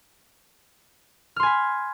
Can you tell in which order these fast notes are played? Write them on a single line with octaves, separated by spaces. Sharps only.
F6 C6 G#5 B5